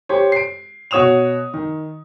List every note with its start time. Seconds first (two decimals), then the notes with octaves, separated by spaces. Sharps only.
0.09 G4 C5 C#5
0.32 C7 D7
0.91 B2 F#4 C#5 D#6 E7 F7
1.54 D#3